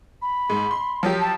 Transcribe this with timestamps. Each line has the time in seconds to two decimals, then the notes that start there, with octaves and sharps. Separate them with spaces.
0.22 B5
0.50 G#2
0.71 C6
1.03 F3 F#3 G4
1.21 A5